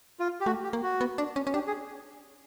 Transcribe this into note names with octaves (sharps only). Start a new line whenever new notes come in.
F4
G4
A3 F#4
G4
A#3
F#4
B3
D4
C#4
C#4
D4 G4
G#4